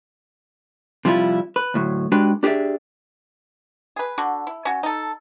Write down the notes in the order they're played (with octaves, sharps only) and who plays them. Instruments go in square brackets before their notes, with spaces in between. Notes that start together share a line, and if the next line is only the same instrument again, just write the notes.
[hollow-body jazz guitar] C3 F3 G3 C#4 E4 F4
B4
D2 A2 F#3
G#3 D4 F#4 G4 B4
D4 G4 G#4 B4 D5 E5
[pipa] G#4 B4
D3 F#4
E4
C#4 F#4
D#4 A4